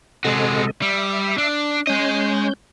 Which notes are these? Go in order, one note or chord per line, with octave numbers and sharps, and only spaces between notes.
C3 G#3 F#4 A4 D#5
G3 E5
D4
G#3 C#4 D#5 G6